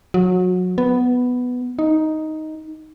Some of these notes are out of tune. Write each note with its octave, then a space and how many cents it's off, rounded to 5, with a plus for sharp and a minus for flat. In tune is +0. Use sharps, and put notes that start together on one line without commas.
F#3 -25
B3 +5
D#4 +5